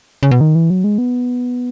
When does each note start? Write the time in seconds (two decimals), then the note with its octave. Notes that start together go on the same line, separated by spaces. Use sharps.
0.23 C#3
0.31 B2
0.41 D#3
0.55 E3
0.70 F#3
0.84 G#3
0.98 B3